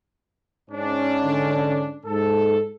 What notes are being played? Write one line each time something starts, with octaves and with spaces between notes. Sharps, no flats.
G#2 C#4 D4
D3
G#2 A4